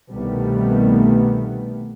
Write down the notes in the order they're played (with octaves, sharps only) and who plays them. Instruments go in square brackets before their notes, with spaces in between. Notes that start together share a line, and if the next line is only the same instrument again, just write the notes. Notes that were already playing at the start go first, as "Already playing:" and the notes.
[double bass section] C2 B2 D#3 G3 A3 B3